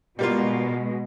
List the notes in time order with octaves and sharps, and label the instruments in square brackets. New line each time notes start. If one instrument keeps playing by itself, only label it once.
[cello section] B2 G#3 [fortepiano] G3 A#3 F4